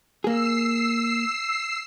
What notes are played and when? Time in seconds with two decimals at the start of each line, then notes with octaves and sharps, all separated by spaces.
0.24 A#3 G#4 E6 C7